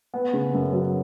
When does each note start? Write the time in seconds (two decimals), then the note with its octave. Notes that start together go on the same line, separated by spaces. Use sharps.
0.14 B3
0.33 C#3
0.54 F#2
0.73 F#3